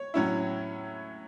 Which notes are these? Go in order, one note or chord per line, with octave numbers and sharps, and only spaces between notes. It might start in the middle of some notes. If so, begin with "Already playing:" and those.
Already playing: C#5
A2 F#3 C#4 E4